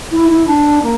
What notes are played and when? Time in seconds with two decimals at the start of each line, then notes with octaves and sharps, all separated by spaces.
0.11 E4
0.29 E4
0.46 D4
0.82 A#3